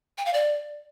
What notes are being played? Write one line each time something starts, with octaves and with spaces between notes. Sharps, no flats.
G5
F5
D5